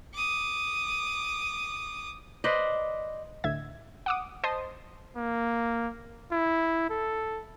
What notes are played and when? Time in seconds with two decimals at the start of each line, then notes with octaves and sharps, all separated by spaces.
0.14 D6 D#6
2.44 B4 C5 D5 D#5
3.44 D2 A2 E5 G#6
4.06 F#5 D6 D#6
4.44 C5 D#5 A5 C6 D#6
5.16 A#3
6.32 E4
6.90 A4